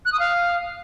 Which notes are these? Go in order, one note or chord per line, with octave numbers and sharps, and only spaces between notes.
F#6
D#6
F5